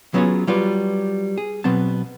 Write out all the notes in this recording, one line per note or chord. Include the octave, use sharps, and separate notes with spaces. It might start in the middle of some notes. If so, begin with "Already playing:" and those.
F#3 B3 C#4 E4 F4 G#4
F#3 G3 F4 B4
G#4
B2 F#3 B3 C4 A5